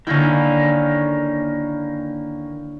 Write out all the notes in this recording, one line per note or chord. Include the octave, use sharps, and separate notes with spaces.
D3 D#3 A#3 C#4 E4